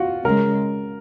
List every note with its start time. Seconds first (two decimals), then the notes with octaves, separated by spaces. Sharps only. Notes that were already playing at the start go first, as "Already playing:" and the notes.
Already playing: F4 F#4
0.25 C#3 G#3 A#4